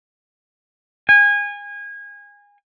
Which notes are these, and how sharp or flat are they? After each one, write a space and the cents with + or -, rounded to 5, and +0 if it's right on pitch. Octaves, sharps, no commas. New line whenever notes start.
G#5 -25